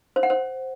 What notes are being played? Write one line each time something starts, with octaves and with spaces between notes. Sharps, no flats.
C5
F#5
C5